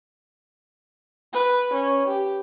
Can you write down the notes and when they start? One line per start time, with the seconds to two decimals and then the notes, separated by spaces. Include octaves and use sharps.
1.33 B4
1.73 C#4
2.08 G4